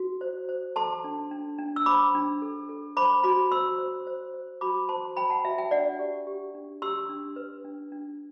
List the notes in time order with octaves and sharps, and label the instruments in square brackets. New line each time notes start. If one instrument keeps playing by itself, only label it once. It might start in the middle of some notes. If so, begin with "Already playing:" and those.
Already playing: [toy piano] F#4
C5
C5
A4 A5 C6
D4
D4
D4
E6
C5 B5 D6
D4
A4
A4
C5 B5 D6
F#4 B5 D6
C5 C6 E6
C5
C5
C5
F#4 B5 D6
C5 A5 C6
C5 G5 B5
F#5 A5
F#4 E5 G5
E5 G5
D4 D5 F#5
G4
G4
D4
G4 C6 E6
D4
B4
D4
D4